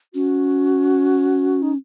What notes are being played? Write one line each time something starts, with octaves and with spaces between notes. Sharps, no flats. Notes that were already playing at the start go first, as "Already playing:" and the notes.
C#4 F#4
D#4